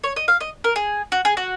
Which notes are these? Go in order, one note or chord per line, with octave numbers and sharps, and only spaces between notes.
C#5
D#5
F5
D#5
A#4
G#4
F#4
G#4
F#4